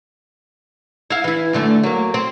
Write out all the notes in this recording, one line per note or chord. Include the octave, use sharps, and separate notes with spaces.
E4 F5
E3 E4
F#2 D3 A3
F#3 A#3
C4